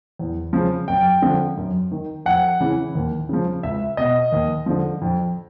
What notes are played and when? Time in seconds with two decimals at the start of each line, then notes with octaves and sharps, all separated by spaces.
0.19 E2
0.53 C#3 F3
0.88 F#2 G5
1.22 D3 F3
1.57 F#2
1.91 D#3
2.26 F2 F#5
2.60 C#3 E3
2.95 D#2
3.29 C#3 F3
3.63 C#2 E5
3.97 B2 D#5
4.32 D#2
4.66 D3 F3
5.02 F2